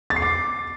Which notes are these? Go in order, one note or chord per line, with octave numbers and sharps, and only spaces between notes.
A6
C7
D6